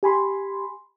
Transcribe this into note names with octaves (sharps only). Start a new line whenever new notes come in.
G4 G#5 B5 C6